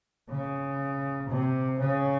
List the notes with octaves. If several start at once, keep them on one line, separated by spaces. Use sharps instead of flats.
C#3
C3
C#3